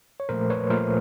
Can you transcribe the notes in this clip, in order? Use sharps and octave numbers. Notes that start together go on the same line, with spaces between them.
C#5
A#2 F3 A3 A#4 C5
B4 C#5
A#2 F3 A3 A#4 C5